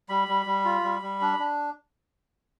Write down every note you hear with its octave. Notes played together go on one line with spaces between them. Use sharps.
G3 B5
G3
G3
F4
G3
G3
D4
D4